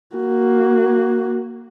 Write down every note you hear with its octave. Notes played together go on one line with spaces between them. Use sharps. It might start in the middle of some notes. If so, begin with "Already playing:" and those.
A#3 F#4